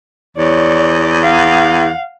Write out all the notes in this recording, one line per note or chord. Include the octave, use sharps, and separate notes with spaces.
E2 C#5 D5
F5 F#5